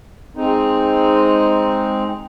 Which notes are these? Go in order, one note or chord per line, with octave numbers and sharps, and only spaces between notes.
G#3 C4 D#4